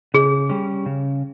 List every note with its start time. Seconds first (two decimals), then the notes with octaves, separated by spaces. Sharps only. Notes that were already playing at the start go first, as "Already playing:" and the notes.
0.14 C#3 G#4
0.50 G3 C#4
0.86 C#3